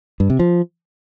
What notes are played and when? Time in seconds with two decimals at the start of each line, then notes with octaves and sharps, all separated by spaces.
0.20 G2
0.30 C3
0.39 F3